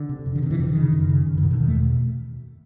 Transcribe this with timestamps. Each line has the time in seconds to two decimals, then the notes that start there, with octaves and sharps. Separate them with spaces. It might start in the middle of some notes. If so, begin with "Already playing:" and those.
Already playing: D3
0.09 C3
0.26 F2
0.36 D3
0.42 C3 D#3
0.51 E3
0.59 F2 F3
0.68 D#3
0.76 C#3
0.93 F#2
1.09 C#3
1.26 F#2
1.38 E3
1.43 B2 D#3
1.51 D3
1.59 E2 D#3
1.68 A3
1.75 B2